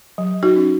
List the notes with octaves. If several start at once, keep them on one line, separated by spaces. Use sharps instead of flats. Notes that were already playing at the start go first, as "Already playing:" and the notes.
F#3
D#4 F#4
C#4